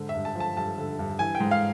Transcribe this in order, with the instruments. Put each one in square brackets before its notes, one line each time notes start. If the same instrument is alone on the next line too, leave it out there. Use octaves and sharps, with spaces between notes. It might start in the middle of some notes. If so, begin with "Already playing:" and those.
Already playing: [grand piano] G#2 D3
E5
G2
A5
F3
A5
G2 A5
D3
G2
E3 G#5
G5
G#2
F5